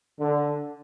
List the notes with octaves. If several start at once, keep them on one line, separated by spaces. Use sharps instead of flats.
D3